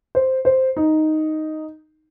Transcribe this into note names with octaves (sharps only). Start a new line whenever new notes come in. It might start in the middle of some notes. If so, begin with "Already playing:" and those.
C5
C5
D#4